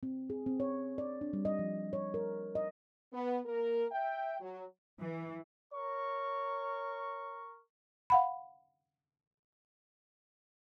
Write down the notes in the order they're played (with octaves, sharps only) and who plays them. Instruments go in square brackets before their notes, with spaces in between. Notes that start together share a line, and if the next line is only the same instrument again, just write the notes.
[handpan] C4
G#4
C4
C#5
D5
D4
G3
D#5
F3
C#5
A#4
D#5
[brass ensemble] B3
A#3 A#4
E5 G5
F#3
[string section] E3
[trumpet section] A#4 C#6 [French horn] C#5
[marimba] F5 F#5 B5